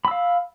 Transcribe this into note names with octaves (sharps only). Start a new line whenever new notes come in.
F5 B5 E6